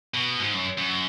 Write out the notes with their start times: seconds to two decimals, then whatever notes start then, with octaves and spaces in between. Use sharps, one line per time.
0.14 B2
0.40 G#2
0.53 F#2
0.78 F#2